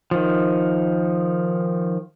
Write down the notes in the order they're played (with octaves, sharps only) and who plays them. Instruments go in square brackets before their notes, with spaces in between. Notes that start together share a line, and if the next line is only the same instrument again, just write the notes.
[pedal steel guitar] D#3 F3